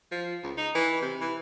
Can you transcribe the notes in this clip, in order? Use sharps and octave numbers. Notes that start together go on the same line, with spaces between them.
F3
C#2
D#4
E3
C3
E3